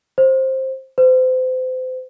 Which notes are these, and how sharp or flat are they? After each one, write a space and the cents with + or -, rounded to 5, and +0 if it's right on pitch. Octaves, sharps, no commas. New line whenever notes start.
C5 +15
C5 -35